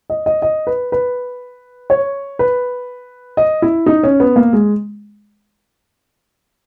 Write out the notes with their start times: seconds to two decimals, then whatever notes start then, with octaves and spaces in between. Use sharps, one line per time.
0.10 D#5
0.26 D#5
0.42 D#5
0.67 B4
0.92 B4
1.90 C#5
2.39 B4
3.37 D#5
3.62 E4
3.86 D#4
4.03 C#4
4.20 B3
4.36 A#3
4.53 G#3